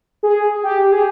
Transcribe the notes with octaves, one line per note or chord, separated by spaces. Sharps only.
G#4
G4
G#4